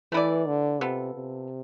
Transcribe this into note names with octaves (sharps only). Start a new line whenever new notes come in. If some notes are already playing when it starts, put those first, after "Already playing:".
E3 A3 E4 B4 D5
D3
C3 B3 F4 A4
C3